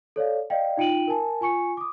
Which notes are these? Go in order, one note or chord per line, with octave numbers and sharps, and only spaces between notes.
A4 C#5 D5 F5
D5 D#5 F5 G5
D#4 F4 G5 D7 D#7 F#7
A#4 G#5 A5
F4 G#5 C#6 C#7
D6 D#6